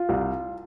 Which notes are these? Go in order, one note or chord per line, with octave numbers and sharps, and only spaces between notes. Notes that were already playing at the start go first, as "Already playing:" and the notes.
Already playing: F4
C2